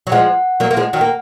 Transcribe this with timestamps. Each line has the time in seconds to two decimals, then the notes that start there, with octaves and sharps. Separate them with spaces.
0.07 F#3
0.12 F3 G#3 F#5
0.60 F#3 A#3
0.71 A#3
0.77 F3 G#3
0.93 D#3 F#3
1.01 A#3